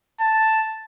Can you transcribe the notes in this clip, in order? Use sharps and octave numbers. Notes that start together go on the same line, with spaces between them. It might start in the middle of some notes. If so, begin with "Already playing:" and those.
A5